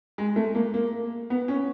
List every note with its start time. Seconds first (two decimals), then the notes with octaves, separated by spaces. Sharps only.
0.18 G#3
0.36 A3
0.55 A#3
0.74 A#3
1.30 B3
1.48 C#4